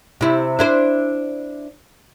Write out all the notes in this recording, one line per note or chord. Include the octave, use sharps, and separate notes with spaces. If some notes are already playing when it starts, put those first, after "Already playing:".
C3 E4
D4 E4 C5